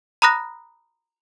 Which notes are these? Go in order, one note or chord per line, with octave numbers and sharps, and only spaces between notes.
A#5 B5 D#6 F#6 A#6